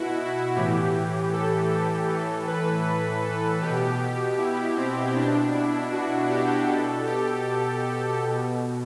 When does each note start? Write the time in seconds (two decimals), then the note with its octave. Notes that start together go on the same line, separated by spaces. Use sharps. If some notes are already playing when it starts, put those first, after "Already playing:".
Already playing: B2 E4 F#4
0.56 A2 E3 G4
1.33 A4
1.71 A4
2.09 A2 E3 A4
2.47 B4
2.85 B4
3.24 A4
3.62 B2 G4
4.38 E4
4.76 C4
5.15 B2 D4
5.54 E4
5.92 F#4
6.30 G4
6.67 B2 A4
7.06 G4
8.21 B2